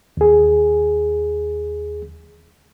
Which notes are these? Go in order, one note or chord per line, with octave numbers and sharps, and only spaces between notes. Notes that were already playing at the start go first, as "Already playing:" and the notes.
D#2 G#4